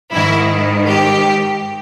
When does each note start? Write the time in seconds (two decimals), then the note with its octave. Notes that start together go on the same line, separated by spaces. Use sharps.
0.13 G#2 D#3 E4
0.87 G4